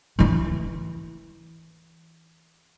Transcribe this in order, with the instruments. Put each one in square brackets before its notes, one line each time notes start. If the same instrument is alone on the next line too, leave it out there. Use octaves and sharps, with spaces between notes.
[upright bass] E3 E4